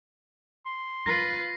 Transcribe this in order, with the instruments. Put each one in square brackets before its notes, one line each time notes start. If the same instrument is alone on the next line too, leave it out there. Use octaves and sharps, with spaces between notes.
[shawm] C6
[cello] F4 B4 [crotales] A#6 C7